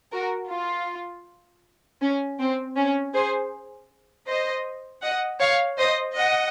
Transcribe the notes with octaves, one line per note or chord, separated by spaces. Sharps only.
F#4 A#4
F4
C#4
C4
C#4
G#4 C5
C5 D#5
D#5 F#5
C#5 F5
C5 D#5
D#5 F#5